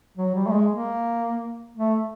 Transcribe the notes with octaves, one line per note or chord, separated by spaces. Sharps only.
F#3
G3
A3
G#3
A#3
A3